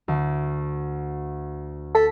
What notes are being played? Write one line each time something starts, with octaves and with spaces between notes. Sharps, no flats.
D2
A4 B6